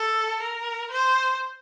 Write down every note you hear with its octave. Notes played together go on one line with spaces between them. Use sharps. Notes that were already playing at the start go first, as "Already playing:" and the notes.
Already playing: A4
A#4
C5